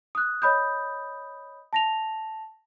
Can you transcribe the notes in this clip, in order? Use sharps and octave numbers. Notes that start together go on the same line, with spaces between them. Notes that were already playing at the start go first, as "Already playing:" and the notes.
D#6 F#6
C#5 D#5 B5 D#6 G6
A5 A#6 F7